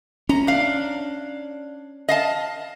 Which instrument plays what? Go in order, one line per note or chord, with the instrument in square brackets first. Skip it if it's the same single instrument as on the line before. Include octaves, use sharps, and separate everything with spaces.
[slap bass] C#4 [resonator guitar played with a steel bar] A#5
[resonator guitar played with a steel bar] D4 F5
D#5 F5 A5